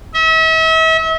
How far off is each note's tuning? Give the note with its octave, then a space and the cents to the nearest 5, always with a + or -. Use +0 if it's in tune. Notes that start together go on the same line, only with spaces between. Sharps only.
E5 -40